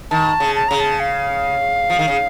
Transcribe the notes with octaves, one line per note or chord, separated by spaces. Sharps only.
D#3 A5
C#3
A5
C#3 A#5
A5
F5
F3
D#3
C#3